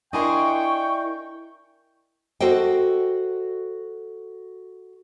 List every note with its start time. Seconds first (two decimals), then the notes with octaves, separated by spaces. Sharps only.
0.13 D4 E4 A#4 D#5 G5 G#5 C6 C#6
2.40 F#4 A4 C5 D#5 G5